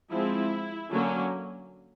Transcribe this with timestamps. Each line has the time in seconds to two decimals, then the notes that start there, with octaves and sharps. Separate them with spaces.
0.11 F3 G#3 C4 E4
0.92 D3 F#3 A#3 C#4